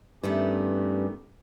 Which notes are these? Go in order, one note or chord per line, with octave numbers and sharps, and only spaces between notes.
G2 D#3 A3 B3 C#4 G4